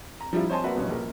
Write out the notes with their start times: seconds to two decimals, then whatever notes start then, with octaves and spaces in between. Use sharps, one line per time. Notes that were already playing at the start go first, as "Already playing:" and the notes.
0.21 A#5
0.33 F3 G3 D4 E4 F4
0.50 C5 C#5 D#5 G#5 A5 C6
0.64 A#3 F#4 B4 D5 E5 F#5
0.75 G1 G2 B2 C#4
0.88 A#1 A#4